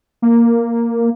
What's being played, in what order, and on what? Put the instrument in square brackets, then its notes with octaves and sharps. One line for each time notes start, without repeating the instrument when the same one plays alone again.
[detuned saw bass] A#3